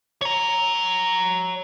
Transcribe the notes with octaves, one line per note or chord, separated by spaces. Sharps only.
C#5 A#5